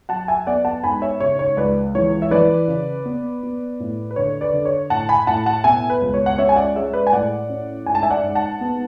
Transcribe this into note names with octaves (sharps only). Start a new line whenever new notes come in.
F#3 F#5 A5
E5 G#5
B3 D5 F#5
F#5 A5
G#2 G#5 B5
C#5 E5
C#3 C#5
C#5
C#2 B4 D5
E3 C#5
E5
E3 B4 D5
C#3
B3
B3
A2
B4
D3 C#5
B4 D5
D3
C#5
A2 F#5 A5
G#5 B5
A2 F#5 A5
F#5 A5
B2 E5 G#5
B4
C#2
C#5
F#5
C#4 C#5 E5
G#5
D5 F#5
G#3 C#5 E5
B4 D5
G#5
A2 D5 F#5
C#4
G#2 G#5
A5
E5 G#5
D5 F#5
G#2
F#5 A5
B3